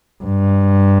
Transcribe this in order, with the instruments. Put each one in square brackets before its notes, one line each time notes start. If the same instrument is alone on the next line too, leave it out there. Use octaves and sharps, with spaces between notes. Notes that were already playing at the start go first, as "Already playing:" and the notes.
[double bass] G2